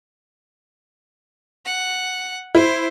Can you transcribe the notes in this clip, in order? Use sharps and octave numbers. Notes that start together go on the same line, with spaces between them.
F#5
E4 C5